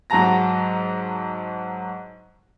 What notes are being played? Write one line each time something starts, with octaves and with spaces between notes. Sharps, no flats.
G#2 F#3 F#4 A5 A#5 A#6